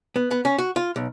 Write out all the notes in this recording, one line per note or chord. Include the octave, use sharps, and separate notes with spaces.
B3
B3
C#4
F#4
F4
B1